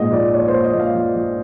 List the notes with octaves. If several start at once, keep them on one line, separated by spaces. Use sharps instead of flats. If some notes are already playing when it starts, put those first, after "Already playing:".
Already playing: A#1 G#2 D#5
F3 D5
A#3 C#5
C5
A#3
D#5
F3
F5
F3
F3